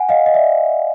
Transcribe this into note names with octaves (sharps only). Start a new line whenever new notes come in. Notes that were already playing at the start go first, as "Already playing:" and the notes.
Already playing: F#5 G#5
D#5 F5
D#5
D5 E5